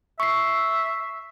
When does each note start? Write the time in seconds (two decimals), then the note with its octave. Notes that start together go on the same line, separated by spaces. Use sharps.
0.20 E5 C#6 C7